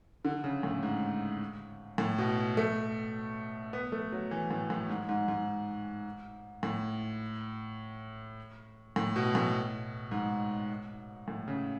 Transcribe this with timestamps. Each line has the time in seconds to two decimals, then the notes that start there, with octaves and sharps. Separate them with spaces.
0.25 D3
0.44 C#3
0.63 A2
0.83 G#2
1.98 A2
2.18 B2
2.57 A3
3.73 B3
3.92 A3
4.12 F#3
4.31 E3
4.51 A2
4.70 A2
4.89 G#2
5.09 G#2
5.28 G#2
6.63 A2
8.96 A2
9.16 B2
9.35 A2
10.11 G#2
11.28 A2
11.48 C#3